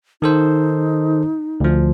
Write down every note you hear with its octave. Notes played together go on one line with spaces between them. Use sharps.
D#3 D#4 A4 C5
D2 F3